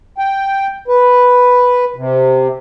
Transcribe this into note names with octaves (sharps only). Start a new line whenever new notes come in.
G5
B4
C3